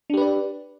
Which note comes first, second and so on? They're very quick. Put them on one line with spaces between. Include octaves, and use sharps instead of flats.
D4 G4 B4 D5